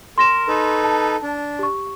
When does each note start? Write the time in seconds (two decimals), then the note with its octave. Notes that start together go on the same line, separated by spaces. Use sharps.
0.18 A#4 C6 A#6 E7
0.48 D#4 A4 B4
0.84 A5
1.23 D4
1.59 G4 C#6